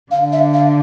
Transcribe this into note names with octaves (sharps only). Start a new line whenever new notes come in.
D3 F5
E5
F5